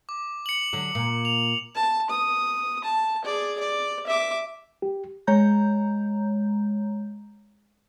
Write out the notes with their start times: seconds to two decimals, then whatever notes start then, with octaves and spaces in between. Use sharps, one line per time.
0.09 D6
0.46 C#7 F#7
0.73 D3 F#3
0.95 A#2
1.25 F7
1.75 A5
2.10 D#6
2.84 A5
3.25 G#4 D5
3.60 D5
4.07 E5 D6
4.82 G4
5.27 G#3 C#5 A#5 G6